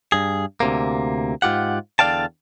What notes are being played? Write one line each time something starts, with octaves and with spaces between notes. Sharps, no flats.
G2 G#4
D2 C3 A#3
G#2 F4 G4 F#5
E2 D3 D5 F5 G5 A5